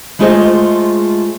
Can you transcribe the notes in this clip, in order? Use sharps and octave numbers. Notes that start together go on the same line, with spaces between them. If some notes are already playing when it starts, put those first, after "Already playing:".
G#3 A3 F4 G#4 C5 D#5